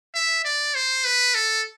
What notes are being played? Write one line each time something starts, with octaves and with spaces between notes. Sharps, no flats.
E5
D5
C5
B4
A4